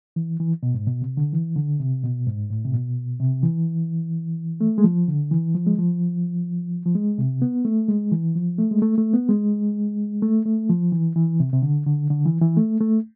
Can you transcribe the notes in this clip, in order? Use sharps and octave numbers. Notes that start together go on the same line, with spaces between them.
E3
E3
B2
G#2
B2
C3
D3
E3
D3
C3
B2
G#2
A2
C3
B2
C3
E3
A3
G#3
F3
D3
E3
F3
G#3
F3
F3
G#3
C3
B3
A3
G#3
E3
F3
A3
G#3
A3
A3
B3
G#3
A3
A3
F3
E3
E3
C3
C3
D3
D3
D3
E3
E3
A3
A3